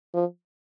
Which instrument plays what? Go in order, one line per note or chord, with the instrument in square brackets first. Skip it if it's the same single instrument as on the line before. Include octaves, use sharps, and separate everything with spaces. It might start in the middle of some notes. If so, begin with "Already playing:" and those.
[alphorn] F3